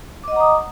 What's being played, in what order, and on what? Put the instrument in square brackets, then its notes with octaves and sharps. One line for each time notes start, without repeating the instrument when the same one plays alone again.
[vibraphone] D6
D#5
F#5
A#5
D#6